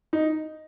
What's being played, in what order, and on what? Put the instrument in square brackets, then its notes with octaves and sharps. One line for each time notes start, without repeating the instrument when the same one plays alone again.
[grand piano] D#4